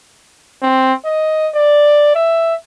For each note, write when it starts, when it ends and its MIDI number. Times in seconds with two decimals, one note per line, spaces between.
0.62 0.94 60
1.05 1.49 75
1.55 2.12 74
2.15 2.54 76